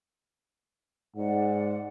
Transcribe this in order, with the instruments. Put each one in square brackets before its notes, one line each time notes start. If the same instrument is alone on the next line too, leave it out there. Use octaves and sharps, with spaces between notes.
[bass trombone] G#2 [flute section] D5 F#5